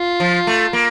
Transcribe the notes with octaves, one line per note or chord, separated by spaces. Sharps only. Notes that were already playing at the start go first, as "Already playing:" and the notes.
Already playing: F4
F3
A3
A#3